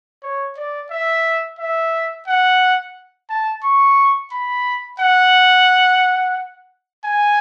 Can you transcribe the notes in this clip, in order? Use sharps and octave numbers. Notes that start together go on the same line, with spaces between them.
C#5
D5
E5
E5
F#5
A5
C#6
B5
F#5
G#5